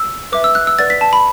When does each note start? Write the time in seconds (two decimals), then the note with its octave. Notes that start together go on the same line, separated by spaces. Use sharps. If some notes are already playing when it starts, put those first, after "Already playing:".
Already playing: E6
0.32 B4 E5 D6
0.44 E6
0.55 F#6
0.67 E6
0.79 B4 D5 F#5 A6
0.90 B6
1.01 A5
1.13 B5